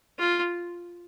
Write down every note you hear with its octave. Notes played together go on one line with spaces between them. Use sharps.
F4